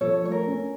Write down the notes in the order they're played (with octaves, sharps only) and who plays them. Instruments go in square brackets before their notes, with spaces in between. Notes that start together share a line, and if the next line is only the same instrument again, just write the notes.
[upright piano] F3 [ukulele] A4 C#5
[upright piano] A3 [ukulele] C#5
[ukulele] A#4
[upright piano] C#4